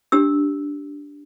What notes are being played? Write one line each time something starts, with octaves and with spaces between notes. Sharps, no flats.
D4 G4 E6